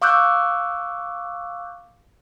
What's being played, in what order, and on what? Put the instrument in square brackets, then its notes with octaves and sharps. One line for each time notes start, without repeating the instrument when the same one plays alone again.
[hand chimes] F5 C#6 D6 E6 F#6 G6